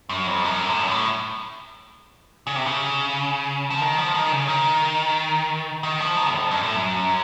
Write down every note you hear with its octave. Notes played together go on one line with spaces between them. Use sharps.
F#2
F2
F#2
A2
F#2
A2
C#3
C3
C#3
F3
D#3
F3
D#3
C#3
D#3
D#3
F3
D#3
F2
F#2
A2
F#2